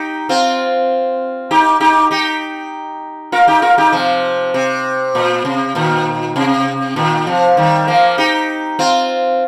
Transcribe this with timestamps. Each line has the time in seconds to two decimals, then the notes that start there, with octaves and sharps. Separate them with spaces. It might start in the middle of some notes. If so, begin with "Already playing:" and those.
Already playing: D#4 G4
0.29 C4 F4
1.51 D#4 G4
1.80 D#4 G4
2.11 D#4 G4
3.32 F4 A#4
3.47 D#4 G4
3.62 F4 A#4
3.78 D#4 G4
3.92 C3 F3
4.54 C3
5.15 A#2
5.45 C3
5.75 A#2 D#3
6.36 C3
6.96 A#2 D#3
7.27 C3 F3
7.57 D#3 G3
7.88 F3 A#3
8.18 D#4 G4
8.79 C4 F4